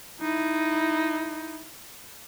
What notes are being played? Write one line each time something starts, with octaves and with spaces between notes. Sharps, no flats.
D#4 E4